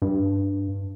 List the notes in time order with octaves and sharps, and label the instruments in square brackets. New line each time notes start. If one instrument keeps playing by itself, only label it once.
[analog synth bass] G2